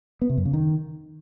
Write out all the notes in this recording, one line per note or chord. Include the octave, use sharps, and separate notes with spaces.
B3
C3
F#2
C#3
D#3